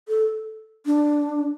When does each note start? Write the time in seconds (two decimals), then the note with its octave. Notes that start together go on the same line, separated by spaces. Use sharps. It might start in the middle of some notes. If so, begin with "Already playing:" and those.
0.08 A4
0.86 D4